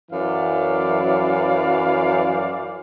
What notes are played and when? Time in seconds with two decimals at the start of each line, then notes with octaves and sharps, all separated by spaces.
0.11 F#2 E3 F#3 D5 F5